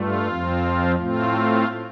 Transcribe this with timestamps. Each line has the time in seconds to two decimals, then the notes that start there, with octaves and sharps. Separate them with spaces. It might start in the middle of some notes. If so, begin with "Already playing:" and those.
Already playing: G2 A3 F4
0.27 F2 F3 C4
0.96 A2 A3 C4 F4